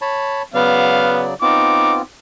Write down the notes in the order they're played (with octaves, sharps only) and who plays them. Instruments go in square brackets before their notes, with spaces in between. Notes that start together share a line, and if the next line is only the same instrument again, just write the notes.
[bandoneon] C#5 A5 B5
[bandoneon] C#3 F#3 D5 [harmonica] B3 F5
[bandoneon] B3 C4 F4 [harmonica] D#4 D6